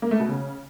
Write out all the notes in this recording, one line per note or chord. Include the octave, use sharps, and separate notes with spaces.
A#3
A3
B2
C#3